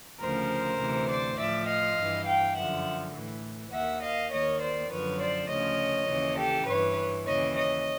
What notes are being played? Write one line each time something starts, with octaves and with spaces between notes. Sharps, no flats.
D2 C#3 F3 A#4 C5
D2 C3 E3
C5 D5
A2 F3 D5 E5
D#5 F5
G2 E3
F5 G5
F#2 D3 F3 E5 F#5
A2 E3
D#2 D#3 E5 F#5
D#5 F5
D#2 D#3 C#5 D#5
C5 D5
F#2 D3 F3 B4 C#5
C5 D5
D2 C#3 F3 C#5 D#5
D#2 C#3 E3
G4 A4
G2 E3 B4 C#5
D#2 C#3 E3 C#5 D#5
C#5 D#5